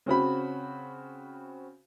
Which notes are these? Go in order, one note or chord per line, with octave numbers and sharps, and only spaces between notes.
C#3 C4 F#4 B5